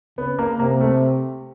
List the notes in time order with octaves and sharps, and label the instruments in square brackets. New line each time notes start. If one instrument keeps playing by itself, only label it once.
[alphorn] C#3 [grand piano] B3
[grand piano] A#3
[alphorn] C3 [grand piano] A#3
[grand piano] A3